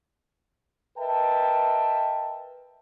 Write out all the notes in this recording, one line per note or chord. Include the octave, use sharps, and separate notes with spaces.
A#4 B4 D#5 E5 G5 A5